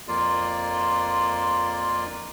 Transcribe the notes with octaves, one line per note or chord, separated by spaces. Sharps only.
F2 A#3 F4 D5 C6